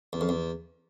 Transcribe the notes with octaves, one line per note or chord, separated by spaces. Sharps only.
E2
F2
E2